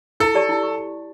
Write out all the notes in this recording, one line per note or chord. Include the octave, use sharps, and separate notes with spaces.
E4 A4
G4 D5 A5 C#6
E4
C#6